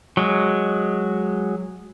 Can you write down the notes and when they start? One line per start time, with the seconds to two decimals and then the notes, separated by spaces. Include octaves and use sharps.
0.17 F#3 G#3